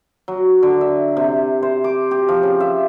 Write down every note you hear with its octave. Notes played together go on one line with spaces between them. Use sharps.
F#3
D3
E5
C3
C5
D6
G4
F3
C#3
E5